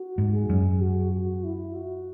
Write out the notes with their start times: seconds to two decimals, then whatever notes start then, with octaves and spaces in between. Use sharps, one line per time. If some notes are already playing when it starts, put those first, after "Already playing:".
Already playing: F#4
0.18 G#2
0.34 G#4
0.50 F#2
0.81 F#4
1.12 F#4
1.44 E4
1.75 F#4